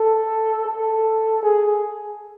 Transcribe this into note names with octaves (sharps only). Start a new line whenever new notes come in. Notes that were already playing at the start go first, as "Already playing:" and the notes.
Already playing: A4
A4
G#4